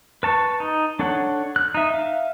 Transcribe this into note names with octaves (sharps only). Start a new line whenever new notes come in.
B4 A5 C#6
D#4
D4 A4 C#5 F#5
F#6
D#4 E5
E5 F5